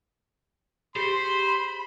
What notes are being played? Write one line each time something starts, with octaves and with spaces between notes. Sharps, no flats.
G4 G#4 C5 B5 C6